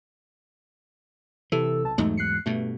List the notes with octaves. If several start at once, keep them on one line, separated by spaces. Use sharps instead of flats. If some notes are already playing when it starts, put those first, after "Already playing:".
C3 E3 A4 E6
B1 A5
E2 G#2 F#3 A3 D#4
F#6 C7 C#7
G2 B2 A3